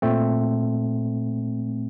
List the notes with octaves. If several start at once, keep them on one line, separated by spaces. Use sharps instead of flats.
A#2 A3 C4